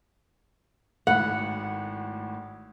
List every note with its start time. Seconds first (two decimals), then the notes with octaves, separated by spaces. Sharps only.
1.07 G#1 A2 F#5 B5